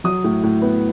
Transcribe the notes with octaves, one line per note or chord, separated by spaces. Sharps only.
F#3 D#6
A2
A2
B3